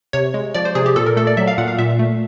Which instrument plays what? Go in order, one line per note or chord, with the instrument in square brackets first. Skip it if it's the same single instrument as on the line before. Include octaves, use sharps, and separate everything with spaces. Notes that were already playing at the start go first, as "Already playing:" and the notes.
[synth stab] C3 C#5
G#3
F3 D5
C5
C3 G#4
G4
A#2 A4
A#4
A3 A4
D5
F#3 E5
F5
A#2 F#5
F5
A#2 E5
A3